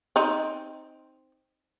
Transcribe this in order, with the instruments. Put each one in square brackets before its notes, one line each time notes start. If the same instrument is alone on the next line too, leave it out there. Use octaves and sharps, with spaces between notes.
[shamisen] C4 D#4